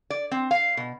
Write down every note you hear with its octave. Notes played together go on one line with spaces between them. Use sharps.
D5
C4
F5
B2